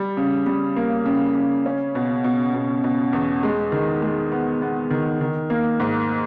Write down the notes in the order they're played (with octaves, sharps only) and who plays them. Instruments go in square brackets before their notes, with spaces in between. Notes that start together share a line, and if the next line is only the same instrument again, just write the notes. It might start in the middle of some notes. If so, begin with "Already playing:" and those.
Already playing: [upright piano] G3
C#3
G3
A#3
C#3
C#3
C#4
B2
B2
B2
B2
E2
G#3
D#3
G#3
B3
B3
D#3
D#3
A#3
G#2